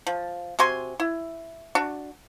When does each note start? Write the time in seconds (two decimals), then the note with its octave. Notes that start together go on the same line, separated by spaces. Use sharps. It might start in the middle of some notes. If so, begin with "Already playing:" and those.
0.07 F3
0.59 C3 F#4 G#5 C6
1.00 E4
1.75 D4 F#4